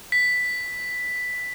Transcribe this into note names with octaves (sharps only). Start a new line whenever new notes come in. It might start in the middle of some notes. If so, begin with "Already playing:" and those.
B6